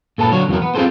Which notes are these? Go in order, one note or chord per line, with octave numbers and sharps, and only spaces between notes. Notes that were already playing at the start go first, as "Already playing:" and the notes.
A#2 A4 B4 A5
D3 F#3 C#5
E2 B2 F3 F#3 A#4
B3
C4 F4 G#4 A4 C5